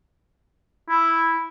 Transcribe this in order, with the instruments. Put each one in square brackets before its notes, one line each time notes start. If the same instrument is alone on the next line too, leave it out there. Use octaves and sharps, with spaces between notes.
[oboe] E4